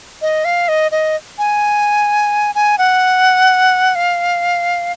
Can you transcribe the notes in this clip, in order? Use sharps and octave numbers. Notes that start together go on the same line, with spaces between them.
D#5
F5
D#5
D#5
G#5
G#5
F#5
F5